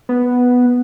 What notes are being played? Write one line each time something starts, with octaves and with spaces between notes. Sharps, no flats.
B3